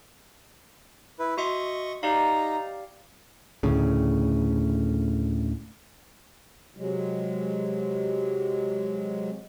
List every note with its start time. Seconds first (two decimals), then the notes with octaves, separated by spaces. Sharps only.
1.19 E4 B4
1.37 F#4 D#5 E5 C6 C#6
2.03 D#4 G4 D5 F5 A#5
3.63 D2 A2 C#3
6.77 C3 F#3 G#3